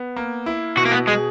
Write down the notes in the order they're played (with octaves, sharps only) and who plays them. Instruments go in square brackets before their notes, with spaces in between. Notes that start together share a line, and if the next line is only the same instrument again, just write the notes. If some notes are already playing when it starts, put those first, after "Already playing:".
Already playing: [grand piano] B3
A#3
E4
[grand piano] B2 [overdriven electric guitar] F#4
[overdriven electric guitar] A#3
B3
[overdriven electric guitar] G#3 [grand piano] G#4